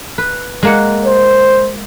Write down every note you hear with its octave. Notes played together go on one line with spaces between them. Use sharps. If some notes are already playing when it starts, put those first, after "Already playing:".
B4
G#3 A#3 F#5
C5